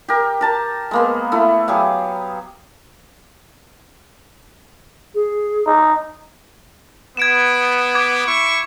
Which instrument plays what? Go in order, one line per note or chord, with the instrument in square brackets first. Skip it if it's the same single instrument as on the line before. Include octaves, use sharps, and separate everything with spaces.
[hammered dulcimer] G4 A#4
A#4 A5 A#5
G#3 A#3 B3
A3 E4
F#3 G4 G#4 F5
[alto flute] G#4
[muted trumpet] D#4
[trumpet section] B3 [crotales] G#6 D7 E7
[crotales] D6 G#6 D7
[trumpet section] E4 C#6